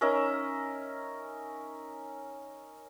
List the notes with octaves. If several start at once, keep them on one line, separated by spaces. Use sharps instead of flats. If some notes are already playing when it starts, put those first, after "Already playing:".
C#4 D#4 A#4 E5